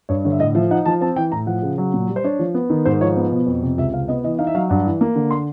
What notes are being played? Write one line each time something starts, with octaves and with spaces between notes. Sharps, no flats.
G2 C#5
D3 C#5
E5
A2 D#5
F3 E5
D#4 F#5
F3 A5
C4 A5
E3 G5
A2 A#5
F3 F#5
C#3
F#3
A#2
G3
C5
D4 C#5
F3
B3
D#3
G#2 C5
F3 C#5
B3
B2
F2
C3
C#2 E5
C3 F5
B3 D#5
E3 D#5
D#4 F5
E5
F#3 F5
G2 F#5
E3
A#3
D3
C6